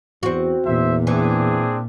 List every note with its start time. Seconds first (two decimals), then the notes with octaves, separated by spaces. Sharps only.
0.23 E2 C4 F#4
0.66 E2 A#2 C5 E5
1.07 E3 C4 D4 G#4